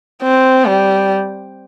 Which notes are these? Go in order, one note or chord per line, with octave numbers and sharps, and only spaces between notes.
C4
G3